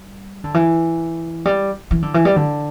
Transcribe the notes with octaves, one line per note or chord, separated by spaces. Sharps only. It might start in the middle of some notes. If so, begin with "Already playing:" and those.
Already playing: G3
D3
E3
G3
E3
D3
E3
G3
D3